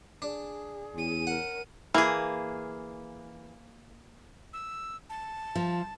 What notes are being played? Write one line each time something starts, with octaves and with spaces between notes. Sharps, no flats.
D4 G#4
E2 C#4 D#7
A#4 F#5
E3 A#3 G#4
E6
A5
F3